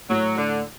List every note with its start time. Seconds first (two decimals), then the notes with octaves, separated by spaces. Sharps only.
0.09 A2 F#3
0.37 D3